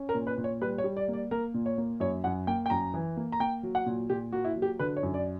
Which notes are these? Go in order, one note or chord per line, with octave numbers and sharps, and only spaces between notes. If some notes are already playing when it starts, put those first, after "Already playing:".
Already playing: C#4
A#4
A#2
B4
A#2
C#5
G3 B4
C#5
G3
D5
A#3
D5
A#3 A#4
A#2
C#5
A#3
F#2 C#5
F#2 F#5
A#3 G5
G5
F#2 A#5
E3
A#3
A#5
A#3 G5
F#3
F#5
A#2
A#2 G4
A#3 F#4
E4
F#3
G4
D3 B4
C#5
F#2
D5